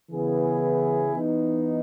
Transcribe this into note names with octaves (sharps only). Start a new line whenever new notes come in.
C#3 E3 B3 E4 G#4
E3 B3 D#4